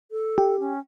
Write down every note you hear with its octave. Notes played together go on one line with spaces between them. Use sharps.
A4
G4
C#4